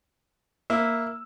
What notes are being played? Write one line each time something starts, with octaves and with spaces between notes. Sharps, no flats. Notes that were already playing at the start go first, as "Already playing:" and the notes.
A#3 E4 E6